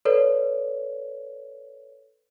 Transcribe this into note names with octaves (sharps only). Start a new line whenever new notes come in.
A4 B4 C#5 D5